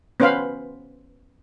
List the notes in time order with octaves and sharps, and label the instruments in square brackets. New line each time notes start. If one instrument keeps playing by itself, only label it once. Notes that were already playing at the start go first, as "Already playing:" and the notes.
[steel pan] B3 C#4 B4 C5 F5 B5